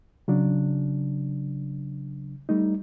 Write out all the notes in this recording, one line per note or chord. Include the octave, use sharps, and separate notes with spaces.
C#3 F#3 D4
G3 A3 D#4